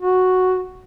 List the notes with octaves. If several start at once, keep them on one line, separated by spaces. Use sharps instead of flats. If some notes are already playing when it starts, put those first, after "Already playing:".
F#4